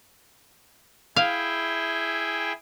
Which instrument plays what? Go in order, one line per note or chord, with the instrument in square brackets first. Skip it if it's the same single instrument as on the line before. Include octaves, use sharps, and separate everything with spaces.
[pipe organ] E4 G#4 G5 [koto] F5